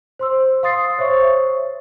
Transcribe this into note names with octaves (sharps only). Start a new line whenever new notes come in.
C5 C6 E6
F5 C6 D#6 A6 C7
C5 C#5 E5 C#6